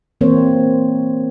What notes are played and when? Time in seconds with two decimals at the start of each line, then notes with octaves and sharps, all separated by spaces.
0.21 E3 A#3 C4 A#4 C5 C#5